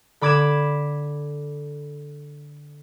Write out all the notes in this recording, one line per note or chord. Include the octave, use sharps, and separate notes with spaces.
D3 B5 D6 G#6 B6 E7